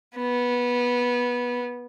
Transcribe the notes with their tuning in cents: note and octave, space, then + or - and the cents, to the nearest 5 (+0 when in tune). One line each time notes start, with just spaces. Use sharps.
B3 -15